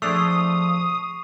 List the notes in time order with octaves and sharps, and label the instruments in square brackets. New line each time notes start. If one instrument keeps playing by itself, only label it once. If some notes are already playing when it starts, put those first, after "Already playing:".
[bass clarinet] F3 [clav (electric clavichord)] A3 D4 G#4 [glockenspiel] C#6 C7 F7 [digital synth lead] D#6